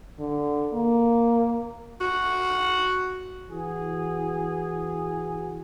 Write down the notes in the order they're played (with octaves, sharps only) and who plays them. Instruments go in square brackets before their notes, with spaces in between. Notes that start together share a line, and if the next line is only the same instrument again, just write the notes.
[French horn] D3
A#3
[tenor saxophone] F#4
[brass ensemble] E3 F#4 G#4